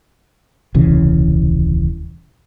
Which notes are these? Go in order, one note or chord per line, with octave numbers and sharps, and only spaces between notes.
D#1 C2 C#3 E3